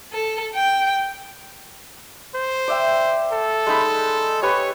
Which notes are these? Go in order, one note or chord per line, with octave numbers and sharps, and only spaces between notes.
A4
G5
C5
D5 E5 G5
A4
G#3 D#4 B5
G4 B4 C#5 C#6